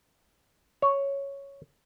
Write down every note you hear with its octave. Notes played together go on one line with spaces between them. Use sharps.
C#5